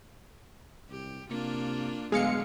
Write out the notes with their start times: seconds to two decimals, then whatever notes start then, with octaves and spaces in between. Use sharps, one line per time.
0.90 C2 G4
1.29 C3 A#3 D4 F4
2.12 A2 D3 F#3 G#3 B3 F5 C#7